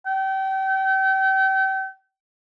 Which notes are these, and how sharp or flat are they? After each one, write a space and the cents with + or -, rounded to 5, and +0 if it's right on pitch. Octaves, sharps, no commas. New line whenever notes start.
G5 -35